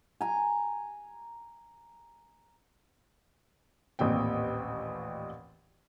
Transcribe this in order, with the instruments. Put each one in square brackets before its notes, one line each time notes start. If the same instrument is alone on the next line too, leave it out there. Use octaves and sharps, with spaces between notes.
[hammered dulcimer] G#5 A#5
[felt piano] A1 D#2 A#2 C4 G5